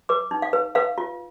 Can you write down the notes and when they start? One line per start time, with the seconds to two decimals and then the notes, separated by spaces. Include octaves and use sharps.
0.09 B4 D6
0.31 D#4
0.42 F5
0.53 B4
0.75 B4 F5
0.98 F4